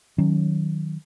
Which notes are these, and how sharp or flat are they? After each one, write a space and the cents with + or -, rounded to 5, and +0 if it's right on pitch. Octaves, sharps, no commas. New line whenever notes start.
D#3 +0 F#3 +0 C#4 -5